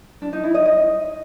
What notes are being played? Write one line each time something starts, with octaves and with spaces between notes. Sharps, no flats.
D4
D#4
E4
D#5
D#5